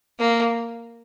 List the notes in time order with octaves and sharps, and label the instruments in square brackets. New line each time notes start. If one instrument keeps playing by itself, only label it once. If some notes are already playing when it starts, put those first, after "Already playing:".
[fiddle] A#3